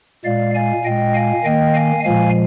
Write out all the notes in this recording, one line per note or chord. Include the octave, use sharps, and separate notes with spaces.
A#2 G#3 D5 F5
F5 G#5
A#2 G#3 D#5 G5
F5 G#5
D#3 A#3 D#5 G5
F5 G#5
A#2 F3 G#3 F5 G#5